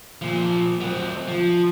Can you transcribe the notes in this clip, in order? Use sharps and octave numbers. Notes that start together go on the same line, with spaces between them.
A#2 F3
F#3 C4
F3